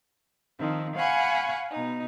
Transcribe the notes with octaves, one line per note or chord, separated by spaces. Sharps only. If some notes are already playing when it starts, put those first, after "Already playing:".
D#3 F3 C4
F5 F#5 G#5 B5 C#6
B2 D#4